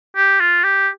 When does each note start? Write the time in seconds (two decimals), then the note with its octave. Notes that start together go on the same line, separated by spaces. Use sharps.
0.17 G4
0.40 F4
0.64 G4